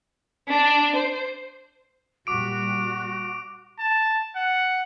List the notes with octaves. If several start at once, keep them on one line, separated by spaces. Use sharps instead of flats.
D4
C5
A#2 G3 F#4 D6 D7
A5
F#5